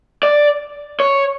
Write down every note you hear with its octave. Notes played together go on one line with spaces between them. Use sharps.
D5
C#5